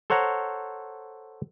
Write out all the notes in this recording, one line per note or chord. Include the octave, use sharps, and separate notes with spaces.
A4 C5 C#5 F#5 A#5